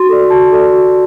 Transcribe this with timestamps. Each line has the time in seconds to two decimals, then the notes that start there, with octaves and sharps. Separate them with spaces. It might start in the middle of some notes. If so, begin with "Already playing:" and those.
Already playing: F#4 C6
0.09 A4 D5
0.30 F#4 A5
0.52 A4 D5
0.72 F#4